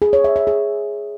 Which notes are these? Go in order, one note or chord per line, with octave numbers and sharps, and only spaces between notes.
G#4
C#5
E5
E5
G#4